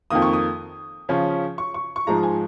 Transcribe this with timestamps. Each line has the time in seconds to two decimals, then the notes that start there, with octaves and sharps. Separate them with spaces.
0.10 F2 D#3 A#3 D#6
0.22 C#6
0.33 D#6
1.09 C#3 F3 C#4
1.58 C#6
1.74 C#6
1.96 C#6
2.07 G#2 F3 G#3 F4 A#5
2.23 G#5